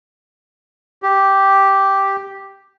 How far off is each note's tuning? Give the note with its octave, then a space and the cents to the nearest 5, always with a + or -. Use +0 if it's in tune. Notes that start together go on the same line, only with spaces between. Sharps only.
G4 -5